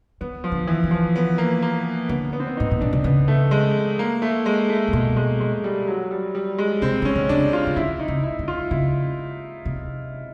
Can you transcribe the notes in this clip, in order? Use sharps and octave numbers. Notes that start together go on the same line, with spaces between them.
D#3 B3
F3
D3
E3
D3
F3
B3
A#3
A#3
D3 B3
B3
C4
B3
A2 D#4
A#2
B2 D4
C3
C#3 B3
A3
G#3
A#3
A3
G#3
A3
C3
B2 G#3
G#3
G#3
G3
F#3
G3
G3
G#3
C3 C4
D#3 C#4
D3
C#3 D4
F4
C#3
D3 E4
D#4
C#3
E4
D3
F4
C#3 E4
C3